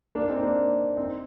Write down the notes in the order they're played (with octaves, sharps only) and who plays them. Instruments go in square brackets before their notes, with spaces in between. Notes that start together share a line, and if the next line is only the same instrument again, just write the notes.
[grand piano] A#3 D4
C4 D#4
A#3 D4
C4 D#4